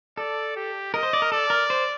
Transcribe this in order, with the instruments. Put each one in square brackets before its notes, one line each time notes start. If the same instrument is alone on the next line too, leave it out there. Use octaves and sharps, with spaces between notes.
[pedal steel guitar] A4 [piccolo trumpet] D5
[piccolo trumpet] G4
[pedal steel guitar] A#4 [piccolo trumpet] D#5
[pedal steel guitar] C5
D5
A#4
[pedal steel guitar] A4 [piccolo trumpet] D5
[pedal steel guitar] A#4
C5